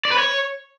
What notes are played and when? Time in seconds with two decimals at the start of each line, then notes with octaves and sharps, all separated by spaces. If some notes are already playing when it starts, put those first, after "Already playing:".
0.05 D5
0.12 B4
0.18 C#5